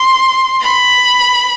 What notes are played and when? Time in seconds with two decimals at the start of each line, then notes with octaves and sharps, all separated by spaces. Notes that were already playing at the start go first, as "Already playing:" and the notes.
Already playing: C6
0.61 B5